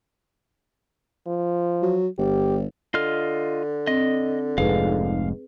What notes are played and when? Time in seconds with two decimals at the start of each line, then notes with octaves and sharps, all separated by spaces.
1.27 F3
1.82 F#3
2.18 G1 G4
2.94 D3 F4 D#5 F6
3.87 C4 D#5
4.58 F1 G#2 G#4 B4 F5